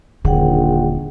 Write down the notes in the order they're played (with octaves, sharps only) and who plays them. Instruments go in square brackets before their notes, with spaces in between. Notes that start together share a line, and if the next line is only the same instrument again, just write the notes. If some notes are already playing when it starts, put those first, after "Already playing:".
[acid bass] D#1 [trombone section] A#1 D#2 [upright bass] D3 [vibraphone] G#4 F#5 G5